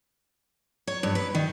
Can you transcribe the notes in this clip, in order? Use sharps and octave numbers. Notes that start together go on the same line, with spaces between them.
C#5
G2
B4
D#3